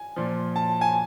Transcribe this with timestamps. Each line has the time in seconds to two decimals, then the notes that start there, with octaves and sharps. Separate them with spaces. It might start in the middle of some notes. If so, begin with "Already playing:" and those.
Already playing: G#5
0.16 A#2 F3
0.56 A5
0.81 G#5